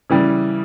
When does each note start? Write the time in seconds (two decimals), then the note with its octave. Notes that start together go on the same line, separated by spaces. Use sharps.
0.10 C#3 E3 G3